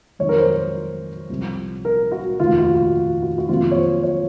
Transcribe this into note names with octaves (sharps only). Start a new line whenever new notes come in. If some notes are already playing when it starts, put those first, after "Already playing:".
F2 D#3 F#3 C4 D#4 C#5
A#4
C5
C5
C2 C3 F3
A#4
F#4
F1 D#2 D#3 F4
F#4
F#4
F#4
F#4
F2 C3 D#3 F#3 A#3 F4
C#5
C5
C#5